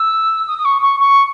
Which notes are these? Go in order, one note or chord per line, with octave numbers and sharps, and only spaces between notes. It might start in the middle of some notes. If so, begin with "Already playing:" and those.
Already playing: E6
D#6
D#6
C#6
C#6
C#6